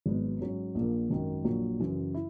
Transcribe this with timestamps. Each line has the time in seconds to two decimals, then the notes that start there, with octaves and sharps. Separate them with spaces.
0.06 G#1 G#2 F#3 B3
0.40 G#2 F#3 C#4
0.75 A#1 A#2 A#3
1.10 G#1 F#2 D#3
1.44 A#1 A#2 F#3
1.79 F#2 C#3 E3
2.14 E4